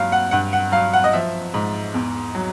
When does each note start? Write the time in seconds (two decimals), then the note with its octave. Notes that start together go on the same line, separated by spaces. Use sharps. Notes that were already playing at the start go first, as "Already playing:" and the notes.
Already playing: G2 A#2 F#3 F5
0.12 F#5
0.31 G2 F#5
0.53 F#5
0.72 F#3 F5
0.93 F#5
1.04 D#5
1.13 F3 E5
1.54 G#2
1.94 E2
2.35 F#3